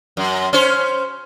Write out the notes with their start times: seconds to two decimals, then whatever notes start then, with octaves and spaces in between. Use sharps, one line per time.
0.17 F#2
0.53 C#4 C5